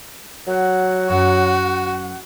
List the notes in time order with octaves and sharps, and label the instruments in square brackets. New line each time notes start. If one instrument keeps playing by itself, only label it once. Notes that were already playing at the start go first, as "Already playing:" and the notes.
[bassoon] F#3 [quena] F#5
[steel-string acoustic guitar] F#2 [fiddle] F#4